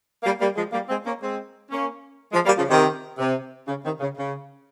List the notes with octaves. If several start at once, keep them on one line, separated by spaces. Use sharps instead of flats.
G3 A#3
G3 A#3
F3 G#3
G3 A#3
G#3 C4
A#3 C#4
G#3 C4
A#3 C#4
F3 G#3
G3 A#3
C#3 F3
C3 D#3
C3
C#3
C3 D#3
C#3
C#3